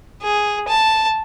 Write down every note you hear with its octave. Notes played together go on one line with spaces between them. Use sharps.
G#4
A5